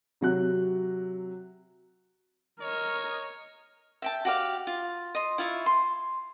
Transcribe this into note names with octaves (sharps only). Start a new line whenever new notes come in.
C3 F#3 F#6
A#4 C#5 D#5
E5 G5 A5
F#4 G4 D5 F5
F4
D#5 C6
E4 F4 E5 C#6
C6